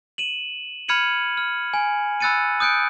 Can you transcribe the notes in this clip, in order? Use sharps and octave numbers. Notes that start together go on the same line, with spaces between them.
D#7 E7 F#7
B5 F6 G#6 C#7 D#7 F#7
F6
G#5
B5 E6 F#6 A6 C#7 D#7
D#6 F#6 G6 C#7 D7